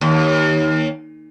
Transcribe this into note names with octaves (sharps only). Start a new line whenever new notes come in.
D#2